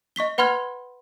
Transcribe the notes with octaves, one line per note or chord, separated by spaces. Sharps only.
D#5 C#6 B6 G7
B4 F#5 B5 C6 F6 G#6